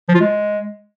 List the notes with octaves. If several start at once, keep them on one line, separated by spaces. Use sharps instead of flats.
F3
F4
G#3